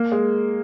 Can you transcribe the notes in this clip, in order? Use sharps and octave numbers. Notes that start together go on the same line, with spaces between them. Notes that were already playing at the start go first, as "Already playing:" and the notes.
Already playing: A#3
G#3